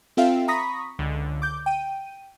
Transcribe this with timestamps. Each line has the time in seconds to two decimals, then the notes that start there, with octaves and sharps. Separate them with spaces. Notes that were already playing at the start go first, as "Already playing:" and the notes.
0.17 C4 F4 A4 E5 F5 G5
0.48 A#5 B5 C#6 D#6 A#6 B6
0.99 C#2 D3
1.42 D6 G6
1.66 G5 D#7